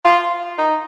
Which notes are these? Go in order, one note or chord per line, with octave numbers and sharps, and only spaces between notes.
F4
D#4